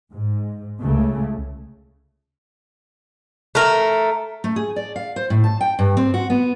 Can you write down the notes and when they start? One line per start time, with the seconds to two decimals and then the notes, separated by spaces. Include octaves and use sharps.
0.13 G#2
0.81 C#2 C#3 A3
3.55 A3 A#4
4.44 A3
4.56 G#4
4.76 D5
4.96 F5
5.16 C5
5.30 A2
5.44 A5
5.61 G5
5.79 G2
5.97 C4
6.14 F#4
6.30 B3